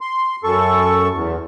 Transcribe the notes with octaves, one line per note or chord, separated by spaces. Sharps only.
C6
F#2 A4 C#6
E2